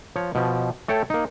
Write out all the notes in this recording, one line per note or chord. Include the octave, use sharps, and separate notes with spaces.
F3 C#5
B2 F3
A3 A4 C#5 G5
A#3 D#4